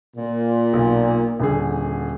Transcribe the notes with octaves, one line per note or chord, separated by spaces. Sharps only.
A#2
B1
D#1 D3 G#4